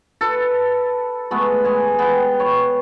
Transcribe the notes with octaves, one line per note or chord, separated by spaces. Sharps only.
A4 B4
G#3 A3 B3
G#3 G#5
B3 G5
C#5